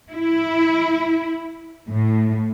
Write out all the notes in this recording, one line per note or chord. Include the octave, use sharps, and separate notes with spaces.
E4
A2